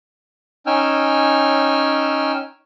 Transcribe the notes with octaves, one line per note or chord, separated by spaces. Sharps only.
C#4 D#4 G5 G#5 E6 F6